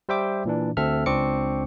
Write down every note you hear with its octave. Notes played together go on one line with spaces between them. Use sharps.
G3 C5 E5 G5 D6
A#2 E3 D4
D2 C4 A4 E5 F6
C#2 C4 D4 C#6 D6 C#7